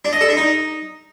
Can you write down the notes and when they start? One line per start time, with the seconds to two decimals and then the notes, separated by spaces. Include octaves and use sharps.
0.05 D4
0.13 D#5
0.21 A4
0.29 D4
0.37 D#4